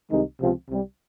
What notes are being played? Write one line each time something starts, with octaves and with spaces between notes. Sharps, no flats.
C2 C3 D#3 G#3 D#4
C#2 C3 F3 C4 F4
C2 C3 G3